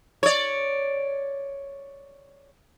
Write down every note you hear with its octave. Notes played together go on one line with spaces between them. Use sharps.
C#5 D5